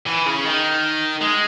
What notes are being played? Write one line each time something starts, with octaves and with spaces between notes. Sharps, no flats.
E3
C#3
D#3
G#3